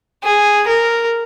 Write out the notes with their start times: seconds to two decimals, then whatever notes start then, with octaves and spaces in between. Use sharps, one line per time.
0.24 G#4
0.67 A#4